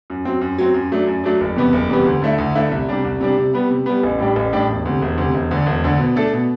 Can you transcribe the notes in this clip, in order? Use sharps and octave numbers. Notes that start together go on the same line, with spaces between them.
F#2
F#3 C4
F#2
F#3 C4
F#2
F#3 A3 D4
F#2
F#3 A3 D4
F#1
E2 C3 G3 B3
F#1
E2 C3 G3 B3
D2
D3 A3 E4
D2
D3 A3 E4
C2
C3 G3 D4
C2
C3 G3 D4
C3
G3 B3
C3
G3 B3
A1
A2 G3 D4 G4
A1
A2 G3 D4 G4
E1
D2 C3
E1
D2 C3
E1
D2 D3
E1
D2 D3
B2
A3 D4 A4
B2